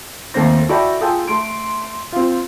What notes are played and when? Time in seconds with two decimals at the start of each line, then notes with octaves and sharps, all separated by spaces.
0.34 D#2 A3 C4 C5 A#6
0.69 E4 F#4 A4 D5 G5 B5
1.01 F4 G#4 A4 G5
1.27 A3 C6 D7
2.12 C4 F4